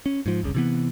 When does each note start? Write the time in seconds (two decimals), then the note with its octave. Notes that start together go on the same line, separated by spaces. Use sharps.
0.06 C#4
0.26 G#2 F3
0.43 F1 C2 C#3
0.55 C3 E3 B3